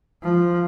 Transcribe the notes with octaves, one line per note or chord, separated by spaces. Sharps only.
F3